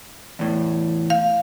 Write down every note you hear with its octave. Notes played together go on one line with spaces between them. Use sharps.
E2 A2
F5